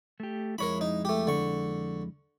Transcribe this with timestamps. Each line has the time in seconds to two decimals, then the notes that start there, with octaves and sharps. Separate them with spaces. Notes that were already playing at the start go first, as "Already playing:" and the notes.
0.20 A3 G4
0.58 F2 G#3 E4 A#4 C#5 B5
0.81 D#4
1.05 A3 G4
1.27 D3 C#6